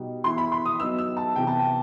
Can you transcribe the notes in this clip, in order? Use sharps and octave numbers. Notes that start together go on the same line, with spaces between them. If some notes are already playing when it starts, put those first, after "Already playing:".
Already playing: B2 G3 D#4
E3 B3 E4 C6
B5
C6
D#6
F#3 B3 D#4 E6
E6
A5
C3 E3 B3 G5
A5
G5